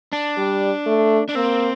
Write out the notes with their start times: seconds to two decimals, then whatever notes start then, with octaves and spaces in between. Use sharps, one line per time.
0.13 D4
0.37 G3
0.86 A3
1.29 D4
1.35 A#3 C4